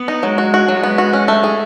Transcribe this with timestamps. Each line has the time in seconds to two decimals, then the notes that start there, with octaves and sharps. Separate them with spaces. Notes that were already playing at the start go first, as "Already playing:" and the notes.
Already playing: B3
0.08 D#4
0.23 F#3 G#3
0.38 F#4
0.54 F#4
0.68 F#3 G#3
0.83 B3
0.98 F#4
1.13 C#4
1.28 A3
1.44 G#4